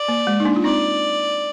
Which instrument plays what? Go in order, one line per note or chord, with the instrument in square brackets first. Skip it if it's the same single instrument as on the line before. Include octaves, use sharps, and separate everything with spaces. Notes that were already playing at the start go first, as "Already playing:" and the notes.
Already playing: [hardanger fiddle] D5
[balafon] A#3
G#3
D#4
A#3 D4
F4
[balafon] C4 D#4 [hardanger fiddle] D5